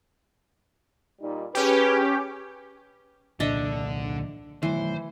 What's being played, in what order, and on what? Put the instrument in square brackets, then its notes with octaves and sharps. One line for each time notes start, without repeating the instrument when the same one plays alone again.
[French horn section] A#2 G3 D#4
[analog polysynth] C#4 G4 [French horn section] G#4 B4
[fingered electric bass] C2 A#2 [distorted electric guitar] D3 [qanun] D4 D#5 E5
[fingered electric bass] D#3 F#3 A3 [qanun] E3 [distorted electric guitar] C5